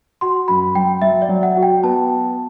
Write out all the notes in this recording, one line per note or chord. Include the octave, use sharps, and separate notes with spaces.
F#4 C6
F#2 B5
F#3 G5
F#3 E5
D5
F#3
F#5
F#4
G5
B3 A5